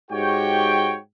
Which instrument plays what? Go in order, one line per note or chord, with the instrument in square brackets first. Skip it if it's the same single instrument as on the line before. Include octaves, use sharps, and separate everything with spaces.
[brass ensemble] G#2 F#4 G4 C#5 G5